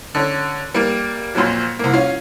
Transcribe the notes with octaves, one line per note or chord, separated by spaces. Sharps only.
D3 C#4
G3 A#3
F2 A#2 F3 F#3
C2 A#3
C#4 F4